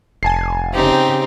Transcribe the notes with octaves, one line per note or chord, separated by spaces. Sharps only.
F1 G#5 A5 C7
C#3 C4 D#4 G4